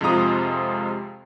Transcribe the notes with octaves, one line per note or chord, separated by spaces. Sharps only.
F2 C3 G#3 F4 A#5 D#6